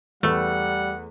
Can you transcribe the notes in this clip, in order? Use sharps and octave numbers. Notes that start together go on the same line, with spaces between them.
E2 G3 A3 B4 F#5